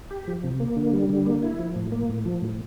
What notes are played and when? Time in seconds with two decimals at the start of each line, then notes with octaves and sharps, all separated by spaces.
0.11 G4
0.27 F3
0.44 C3
0.60 A#3
0.76 D3
0.93 G3
1.09 D3
1.26 A#3
1.43 E4
1.59 F3
1.76 A2
1.92 A#3
2.09 A2
2.25 F3
2.42 A2